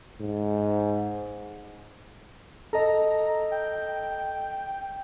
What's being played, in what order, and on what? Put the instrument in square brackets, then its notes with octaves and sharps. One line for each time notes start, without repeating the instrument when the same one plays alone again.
[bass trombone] G#2
[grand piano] A4 D#5 [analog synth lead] A#5
[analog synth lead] G5